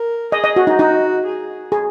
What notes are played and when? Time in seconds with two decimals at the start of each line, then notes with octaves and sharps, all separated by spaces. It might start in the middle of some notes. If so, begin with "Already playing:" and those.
Already playing: A#4
0.32 G#4 D#5
0.44 D#5
0.56 F#4
0.67 D#4
0.79 D#4 F#4
1.26 G#4
1.72 G#4